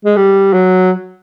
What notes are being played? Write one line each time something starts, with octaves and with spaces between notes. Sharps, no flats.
G#3
G3
F#3